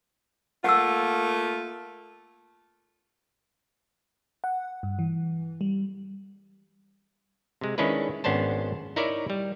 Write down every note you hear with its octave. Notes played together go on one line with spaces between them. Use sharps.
A3 A#3 F4 F#5 E6
F#5
G2
E3
G3
C3 G#3
D#3 G#3 C#4 D4 E4 B4
G#1 B3 C#4 D4 C5 A5
D#4 E4 A#4 C#5 D5 E5
G3